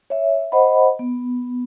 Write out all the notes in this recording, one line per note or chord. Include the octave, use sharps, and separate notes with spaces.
C#5 E5
C5 D#5 F#5 B5
B3